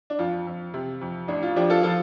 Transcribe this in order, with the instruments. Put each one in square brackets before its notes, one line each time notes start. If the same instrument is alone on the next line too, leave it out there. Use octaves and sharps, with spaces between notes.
[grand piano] D4
F2 F4
F2
C3
F2
A1 D4
F4
F3 D4 G4
F4 A4
F3 F4 A4